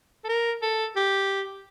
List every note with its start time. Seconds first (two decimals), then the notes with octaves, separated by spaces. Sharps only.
0.24 A4
0.29 A#4
0.62 A4
0.96 G4